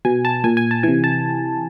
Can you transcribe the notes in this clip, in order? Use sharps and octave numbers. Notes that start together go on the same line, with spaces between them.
B2 G#5
A5
A#2 G#5
G#5
A5
C3 E3 G#5
A5